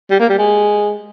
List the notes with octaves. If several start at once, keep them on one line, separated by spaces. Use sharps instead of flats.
G3
A#3
G3
G#3